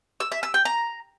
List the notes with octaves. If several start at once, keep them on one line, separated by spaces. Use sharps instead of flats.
E6
E5
E6
G5
A#5